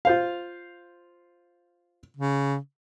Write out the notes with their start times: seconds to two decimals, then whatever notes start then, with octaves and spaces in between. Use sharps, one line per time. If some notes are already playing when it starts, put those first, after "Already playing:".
0.05 F4 C5 F5
2.17 C#3